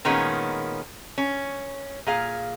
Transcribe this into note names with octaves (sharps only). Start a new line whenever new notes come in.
A#2 D#3 G#3 B3 C#4
C#4
A#2 G#4 F5